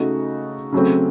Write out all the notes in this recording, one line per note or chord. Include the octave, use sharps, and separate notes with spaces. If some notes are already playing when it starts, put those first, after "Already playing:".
Already playing: C#3 A3 D#4 F#4
C#3 F#3 A3 C4